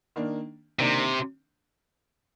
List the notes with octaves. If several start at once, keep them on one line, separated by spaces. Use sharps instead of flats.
D#3 A#3 D4
C3 D#3 A#3 D4